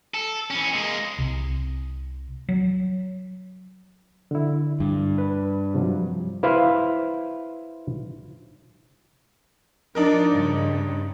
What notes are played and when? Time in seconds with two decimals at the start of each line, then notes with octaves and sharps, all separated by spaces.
0.14 A4
0.51 E3 C#4
0.74 G#3 A#3
1.19 C2
2.49 F#3
4.31 D3 E4
4.80 G2
5.18 B4
5.74 C3 F3 F#3
6.43 E4 B4 C5 F5
9.95 F3 D4 D#4 A#4 D5
10.30 G2 C#3